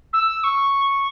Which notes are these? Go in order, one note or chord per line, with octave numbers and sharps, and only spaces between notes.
E6
C#6